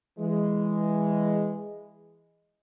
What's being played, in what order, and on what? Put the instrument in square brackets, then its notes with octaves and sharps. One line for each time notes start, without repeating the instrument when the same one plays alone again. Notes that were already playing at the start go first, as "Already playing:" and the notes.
[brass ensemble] E3 G#3